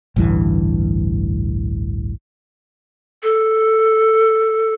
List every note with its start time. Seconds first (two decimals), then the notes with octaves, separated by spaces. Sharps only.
0.16 A1 D2 G2 E3
3.23 A4